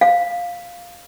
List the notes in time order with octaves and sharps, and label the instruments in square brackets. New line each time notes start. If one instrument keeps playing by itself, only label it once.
[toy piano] F5